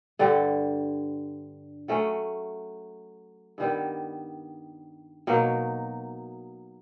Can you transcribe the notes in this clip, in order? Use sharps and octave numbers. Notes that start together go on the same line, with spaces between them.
G2 D3 G3
F#3 A3 C#4
G2 D#3 G3 B3
B2 F#3 A#3 D#4